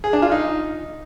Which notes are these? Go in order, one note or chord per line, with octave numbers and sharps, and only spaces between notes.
G#4
D4
F4
D#4